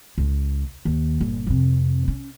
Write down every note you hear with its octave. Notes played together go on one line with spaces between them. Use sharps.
C#2
D#2
G1 A#2
F2 C3
C#4